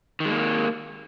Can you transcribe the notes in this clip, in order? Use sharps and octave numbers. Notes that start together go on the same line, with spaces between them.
D#3 G#3 A#3